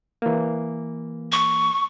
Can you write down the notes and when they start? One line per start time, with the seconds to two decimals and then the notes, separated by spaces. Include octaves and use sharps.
0.22 E3 A#3
1.32 C#6